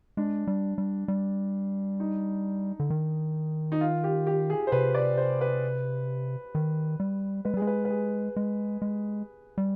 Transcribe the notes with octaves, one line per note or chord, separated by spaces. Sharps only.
G#3 D4
G3
G3
G3
D#4
D3
D#3
D#4
F4
G4
G4
G#4
C5
C3 B4
D5
C5
B4
D#3
G3
G#3 B4
G3 G#4
G#3
B4
B4
G#4
G#3
G#3
G3